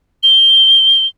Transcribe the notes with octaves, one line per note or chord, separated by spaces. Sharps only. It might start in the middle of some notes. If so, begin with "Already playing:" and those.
G7